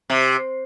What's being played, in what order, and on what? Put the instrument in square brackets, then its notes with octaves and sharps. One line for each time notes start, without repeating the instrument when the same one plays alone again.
[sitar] C3